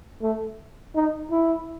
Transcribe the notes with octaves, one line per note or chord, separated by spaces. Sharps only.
A3
D#4
E4